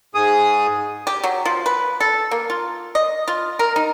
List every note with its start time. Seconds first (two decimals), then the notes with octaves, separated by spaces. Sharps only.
0.15 G#2 G#4 D#6
1.07 G4
1.23 F#3
1.45 F3
1.66 B4
2.00 A4
2.31 A#3
2.50 F4
2.95 D#5
3.28 F4
3.59 A#4
3.76 D#4